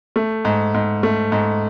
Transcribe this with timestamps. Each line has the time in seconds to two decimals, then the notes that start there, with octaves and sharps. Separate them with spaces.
0.16 A3
0.45 G#2
0.74 G#2
1.03 A3
1.32 G#2